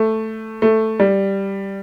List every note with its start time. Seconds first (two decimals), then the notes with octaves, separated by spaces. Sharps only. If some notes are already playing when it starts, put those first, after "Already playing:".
Already playing: A3
0.62 A3
1.00 G3